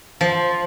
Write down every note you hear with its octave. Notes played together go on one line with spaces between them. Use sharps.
F3